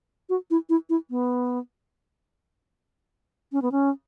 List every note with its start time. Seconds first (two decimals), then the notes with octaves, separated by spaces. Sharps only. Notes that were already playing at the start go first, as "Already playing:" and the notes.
0.29 F#4
0.50 E4
0.69 E4
0.90 E4
1.10 B3
3.52 C#4
3.62 B3
3.72 C#4